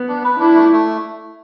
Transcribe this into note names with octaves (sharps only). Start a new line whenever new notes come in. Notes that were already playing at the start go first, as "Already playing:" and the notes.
Already playing: B3
D4
B4
D4 E4
A3
A3